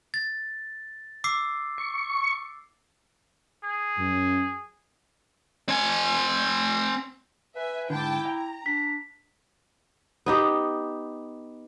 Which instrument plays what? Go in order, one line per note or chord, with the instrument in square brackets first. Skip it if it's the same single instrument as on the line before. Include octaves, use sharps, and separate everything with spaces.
[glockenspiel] A6
D6 E6 C7
[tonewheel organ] C#6
[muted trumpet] G#4
[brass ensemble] F#2
[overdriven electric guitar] C4 G#5
[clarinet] B4 [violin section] E5 G#5
[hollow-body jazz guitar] G#2 D3 [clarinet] E4 [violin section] G5 A5 D6
[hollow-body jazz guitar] G5 [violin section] A#5
[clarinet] D4 [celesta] B6
[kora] B3 D#4 G4